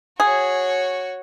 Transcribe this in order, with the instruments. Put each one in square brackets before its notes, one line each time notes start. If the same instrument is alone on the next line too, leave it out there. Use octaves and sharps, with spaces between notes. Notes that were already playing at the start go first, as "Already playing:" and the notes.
[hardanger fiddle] F#4 C#5 [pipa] G#4